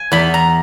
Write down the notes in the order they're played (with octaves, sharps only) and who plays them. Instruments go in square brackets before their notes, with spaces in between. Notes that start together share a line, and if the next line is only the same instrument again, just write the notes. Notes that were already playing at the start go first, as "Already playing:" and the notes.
Already playing: [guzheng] G#5
E2 B5
A#5